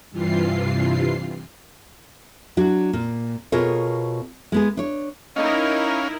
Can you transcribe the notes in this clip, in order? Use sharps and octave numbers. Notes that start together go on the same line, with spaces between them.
G2 C3 E3 F4 C7
F#3 D4 F#4
A#2
B2 F4 G#4 A#4 C#5
G#3 B3 G#4
D4 C#5
C#4 D#4 E4 A#4 D#5 F5